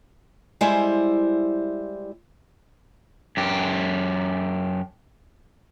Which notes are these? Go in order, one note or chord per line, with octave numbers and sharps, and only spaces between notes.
G3 G#3 E4 C5 E5
F#2 G4